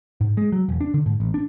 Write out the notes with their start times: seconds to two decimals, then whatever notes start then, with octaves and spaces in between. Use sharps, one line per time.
0.21 G#2
0.37 G#3
0.52 F#3
0.69 E1
0.81 D4
0.94 D3
1.06 G#2
1.20 A1
1.34 D4